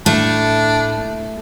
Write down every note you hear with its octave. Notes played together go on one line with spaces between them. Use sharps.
A2 A3 D4